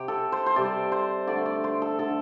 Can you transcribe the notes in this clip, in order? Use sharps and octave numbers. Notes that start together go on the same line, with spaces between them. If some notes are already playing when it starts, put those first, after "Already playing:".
Already playing: C3 G4
A4
C5
C5
C3 G3 D5
C5
D3 A3 D5
D5
C5
A4
D3 A3 A4